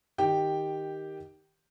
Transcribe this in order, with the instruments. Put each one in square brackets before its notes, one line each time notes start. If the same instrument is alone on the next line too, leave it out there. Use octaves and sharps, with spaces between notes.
[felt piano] D#3 G4 G5